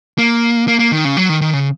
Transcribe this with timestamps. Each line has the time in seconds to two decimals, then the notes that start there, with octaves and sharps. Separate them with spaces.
0.18 A#3
0.68 A#3
0.79 A#3
0.92 D#3
1.05 C#3
1.17 F#3
1.29 D#3
1.41 D#3
1.54 C#3